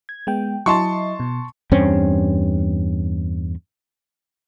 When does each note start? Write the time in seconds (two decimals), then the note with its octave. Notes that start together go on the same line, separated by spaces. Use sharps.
0.09 G#6
0.27 G#3 B3 G5
0.66 F#3 E4 D#5 A5 C6 C#6
1.20 B2
1.71 E2 G2 C4 C#4